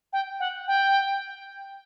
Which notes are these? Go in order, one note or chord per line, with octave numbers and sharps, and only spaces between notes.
G5
F#5
G5